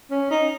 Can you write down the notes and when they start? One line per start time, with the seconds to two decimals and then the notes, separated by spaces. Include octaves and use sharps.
0.11 C#4
0.31 D#4